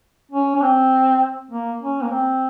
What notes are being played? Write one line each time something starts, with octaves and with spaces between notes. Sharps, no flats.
C#4
C#4
C4
A#3
C#4
A#3
C4